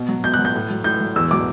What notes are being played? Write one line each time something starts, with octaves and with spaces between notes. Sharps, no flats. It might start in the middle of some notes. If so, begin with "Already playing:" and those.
Already playing: B2
F#3
B2 G6
F#3 F#6
G6
A2
F#3
A2 G6
F#3
E2 E6
B2 F#3 D6